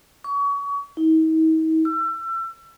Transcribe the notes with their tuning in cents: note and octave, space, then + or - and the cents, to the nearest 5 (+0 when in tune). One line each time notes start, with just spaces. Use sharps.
C#6 +35
D#4 +45
E6 +30